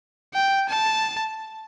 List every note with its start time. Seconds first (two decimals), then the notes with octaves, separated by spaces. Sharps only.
0.34 G5
0.69 A5